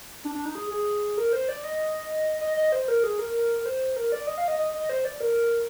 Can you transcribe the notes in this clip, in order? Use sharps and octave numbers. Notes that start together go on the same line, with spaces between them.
D4
D4
D#4
G#4
G#4
A#4
C5
D5
D#5
D#5
D#5
C5
A#4
G#4
A#4
C5
A#4
D5
D#5
F5
D#5
D#5
D#5
C5
D5
A#4